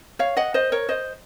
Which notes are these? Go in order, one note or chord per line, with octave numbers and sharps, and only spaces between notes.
C#5 F5
D#5 F#5
C5 D#5
A#4 C#5
C5 D#5